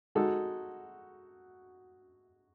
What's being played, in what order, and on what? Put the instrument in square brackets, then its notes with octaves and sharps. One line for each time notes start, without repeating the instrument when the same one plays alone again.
[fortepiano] G#3 D#4 A4 [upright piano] F#4